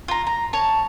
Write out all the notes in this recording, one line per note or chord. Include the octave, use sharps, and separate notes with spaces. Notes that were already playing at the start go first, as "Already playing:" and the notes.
F4 A#5
A#5
C#5 A5